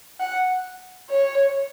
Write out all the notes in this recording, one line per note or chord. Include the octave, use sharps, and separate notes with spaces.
F#5
C#5